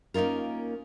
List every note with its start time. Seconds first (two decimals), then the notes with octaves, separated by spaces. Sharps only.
0.14 A#3 C#4 D#4 F4 A#4